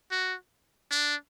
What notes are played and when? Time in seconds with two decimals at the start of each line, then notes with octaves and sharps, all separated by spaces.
0.11 F#4
0.91 D4